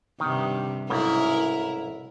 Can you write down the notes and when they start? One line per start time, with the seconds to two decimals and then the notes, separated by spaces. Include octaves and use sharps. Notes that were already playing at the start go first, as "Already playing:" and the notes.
0.20 G2 C3 D#3 F#5
0.90 B1 G#2 C#3 E4 A#4